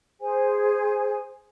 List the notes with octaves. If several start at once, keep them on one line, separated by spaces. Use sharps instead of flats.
G#4 C5 G#5